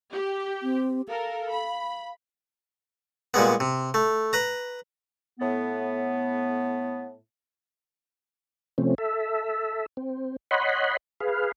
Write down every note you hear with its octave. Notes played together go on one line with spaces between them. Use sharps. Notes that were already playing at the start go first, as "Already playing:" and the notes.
G4
C4
A4 A#4 F5
B5
A#2 G3 G#3 B3
C3
A3
B4 A#5
A2 B3
C3 F3 A3 C4 C#4
A4 E5
C4
C#5 D#5 F#5 B5 C6
G#4 B4 F5